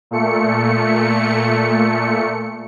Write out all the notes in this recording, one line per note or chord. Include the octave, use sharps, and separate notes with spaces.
A#2 A3 C#7